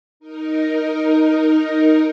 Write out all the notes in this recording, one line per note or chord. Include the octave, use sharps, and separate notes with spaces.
D#4 A#4